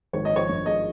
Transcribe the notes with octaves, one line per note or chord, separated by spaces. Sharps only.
G#1 C#5
D#5
F3 C#5
G2
G#3 D#5